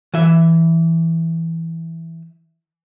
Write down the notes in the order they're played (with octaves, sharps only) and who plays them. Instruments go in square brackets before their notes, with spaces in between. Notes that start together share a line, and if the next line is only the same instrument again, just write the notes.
[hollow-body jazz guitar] E3 E5